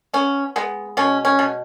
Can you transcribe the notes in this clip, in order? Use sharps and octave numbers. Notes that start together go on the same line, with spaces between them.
B3 C#4
G#3 B3
B2 C#4
C#4
B2